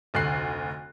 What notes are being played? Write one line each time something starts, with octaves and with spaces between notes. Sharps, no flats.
F1 D2 F#6 C7